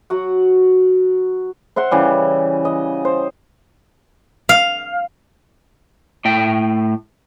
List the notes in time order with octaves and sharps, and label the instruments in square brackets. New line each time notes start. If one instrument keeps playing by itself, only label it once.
[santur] F#3 F#4 F#5
[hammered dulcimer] C5 E5 F#5 C6
C#3 E3 G3
D#5
C5
[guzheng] F5
[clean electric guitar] A2 A3 G5